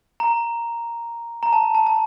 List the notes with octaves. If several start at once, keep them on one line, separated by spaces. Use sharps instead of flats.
A#5
A#5
A5
A5
A5